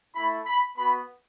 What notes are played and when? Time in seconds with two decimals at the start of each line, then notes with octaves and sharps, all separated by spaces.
0.15 A3 E4 B5
0.46 B5
0.77 B3 F#4 B5